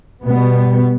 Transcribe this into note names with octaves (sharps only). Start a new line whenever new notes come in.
B2 G3 B3